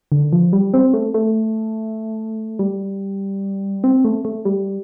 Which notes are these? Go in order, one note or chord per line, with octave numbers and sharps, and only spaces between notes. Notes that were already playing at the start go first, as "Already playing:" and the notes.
D3
F3
G3
C4
A3
A3
G3
C4
A3
A3
G3